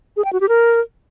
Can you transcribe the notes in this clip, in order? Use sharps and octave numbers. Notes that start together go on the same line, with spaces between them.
G#4
G5
F#4
G4
A#4